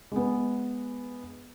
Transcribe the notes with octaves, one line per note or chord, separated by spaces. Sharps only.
G#3 B3